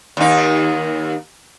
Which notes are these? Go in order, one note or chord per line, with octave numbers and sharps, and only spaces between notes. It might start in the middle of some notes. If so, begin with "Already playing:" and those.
D#2 D#4